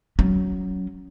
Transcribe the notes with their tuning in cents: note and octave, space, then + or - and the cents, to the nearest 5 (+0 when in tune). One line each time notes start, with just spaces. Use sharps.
F#3 +10 C#4 +10